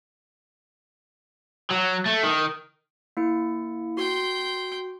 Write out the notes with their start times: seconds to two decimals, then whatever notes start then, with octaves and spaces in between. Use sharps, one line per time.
1.70 F#3
2.06 A3
2.23 D#3
3.17 A#3 E4 C#7
3.97 F#4 G5 C6